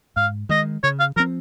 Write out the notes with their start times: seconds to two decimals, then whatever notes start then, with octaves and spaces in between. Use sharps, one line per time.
0.16 G#2 F5
0.49 D#3 G#3 D#5
0.83 C#3 C#5
1.00 F5
1.16 F3 A#4
1.20 C4